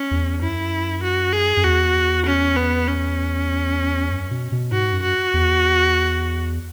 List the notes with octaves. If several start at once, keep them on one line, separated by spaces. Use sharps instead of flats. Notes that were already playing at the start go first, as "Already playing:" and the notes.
Already playing: C#4
E2
F#2 E4
F#4
G#4
F#2
E2 F#4
C#4
B3
C#4
F#2
B2
B2
G#2 F#4
F#2
F#4
E2